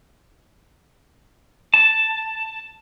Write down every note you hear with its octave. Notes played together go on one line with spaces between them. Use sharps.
A5